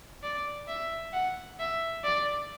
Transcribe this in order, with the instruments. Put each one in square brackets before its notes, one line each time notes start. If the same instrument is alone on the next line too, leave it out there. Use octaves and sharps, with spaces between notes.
[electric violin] D5
E5
F#5
E5
D5